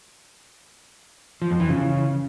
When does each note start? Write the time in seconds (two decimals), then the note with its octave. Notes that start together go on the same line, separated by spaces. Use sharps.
1.42 F3
1.51 F2
1.60 E3
1.69 C#3